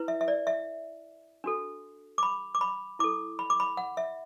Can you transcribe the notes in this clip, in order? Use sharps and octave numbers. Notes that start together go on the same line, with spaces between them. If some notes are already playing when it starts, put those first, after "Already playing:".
Already playing: E4 B4
E5
E5
D5
E5
D4 F#4 A4
D6
B5
D6
B5
E4 A4 D6
B5
D6
B5
F#5
E5